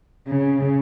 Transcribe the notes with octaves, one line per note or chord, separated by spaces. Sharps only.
C#3